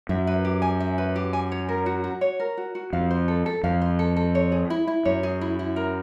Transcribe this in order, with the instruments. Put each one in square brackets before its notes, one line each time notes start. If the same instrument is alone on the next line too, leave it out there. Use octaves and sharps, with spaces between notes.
[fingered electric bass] F#2 [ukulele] E5
[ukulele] B4
G4
G#5
E5
B4
G4
G#5
C#5
A#4
F#4
F#4
C#5
A#4
F#4
F#4
[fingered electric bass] F2 [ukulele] F5
[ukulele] C5
A4
A4
[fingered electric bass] F2 [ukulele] F5
[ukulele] C5
A4
A4
C#5
G#4
E4
E4
[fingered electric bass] F#2 [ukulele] C#5
[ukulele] G#4
E4
E4
A#4